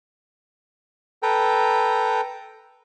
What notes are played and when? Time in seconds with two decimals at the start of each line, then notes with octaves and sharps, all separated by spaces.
1.23 A4 B4 G5 A#5